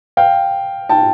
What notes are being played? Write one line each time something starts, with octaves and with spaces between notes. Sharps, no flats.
F5 G5
G5 A5